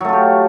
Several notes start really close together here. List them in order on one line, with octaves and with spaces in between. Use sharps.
F#3 A3 F4 G4